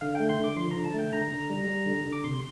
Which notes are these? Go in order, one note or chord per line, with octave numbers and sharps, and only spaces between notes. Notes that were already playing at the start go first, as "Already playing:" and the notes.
D3 F5
A3 G5
C6
D3 D6
F3 C6
D3 A#5
A5
A3
G5
D3 A#5
D3
G3
G3
D3
D3
D6
C3 C6